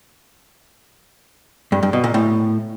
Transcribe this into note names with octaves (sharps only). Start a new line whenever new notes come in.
G2
G2
B2
A#2
A2